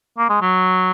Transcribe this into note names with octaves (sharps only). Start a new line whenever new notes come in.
A#3
G#3
F#3